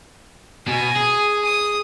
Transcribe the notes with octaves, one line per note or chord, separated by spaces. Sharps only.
B2 G#5
G#4
D#6